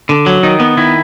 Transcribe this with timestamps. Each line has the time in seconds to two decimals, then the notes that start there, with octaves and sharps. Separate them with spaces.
0.09 D3
0.26 F#3
0.43 D#3 D#4
0.60 B3
0.77 D#3 E4